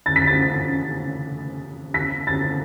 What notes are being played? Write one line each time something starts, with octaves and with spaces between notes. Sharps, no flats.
A6
B6
A6
B6
A6